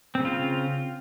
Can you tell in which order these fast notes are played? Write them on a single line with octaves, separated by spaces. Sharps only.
C4 C#3 F4